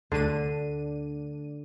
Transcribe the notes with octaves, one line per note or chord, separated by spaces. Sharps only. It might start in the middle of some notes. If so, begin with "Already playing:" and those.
D2 D3 D4 D#7